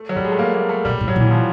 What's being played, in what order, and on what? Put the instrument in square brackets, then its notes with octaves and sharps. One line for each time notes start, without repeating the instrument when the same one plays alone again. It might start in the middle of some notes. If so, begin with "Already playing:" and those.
Already playing: [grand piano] A3
F#3
[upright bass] A2 [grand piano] G3
[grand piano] G#3
A3
A#3
A#3
A3
[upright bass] A#2 [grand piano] G3
[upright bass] A2
[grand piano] F#3
[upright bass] A#2 [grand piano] E3
[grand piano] F3